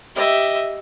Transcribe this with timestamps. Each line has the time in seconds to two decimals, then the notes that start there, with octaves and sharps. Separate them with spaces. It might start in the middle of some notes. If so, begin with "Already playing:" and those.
0.16 G4 D#5 E5